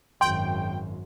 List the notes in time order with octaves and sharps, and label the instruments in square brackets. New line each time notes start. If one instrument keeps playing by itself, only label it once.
[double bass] G#1 F#2 [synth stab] G5 [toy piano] C6